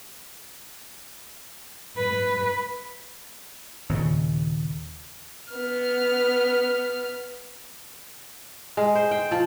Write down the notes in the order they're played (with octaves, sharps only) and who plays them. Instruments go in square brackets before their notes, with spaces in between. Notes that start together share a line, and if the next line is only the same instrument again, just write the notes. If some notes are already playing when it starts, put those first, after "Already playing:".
[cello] B4
[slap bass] D#2 A#2 C#3
[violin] B3 F6
[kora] G#3
C5
G5
F3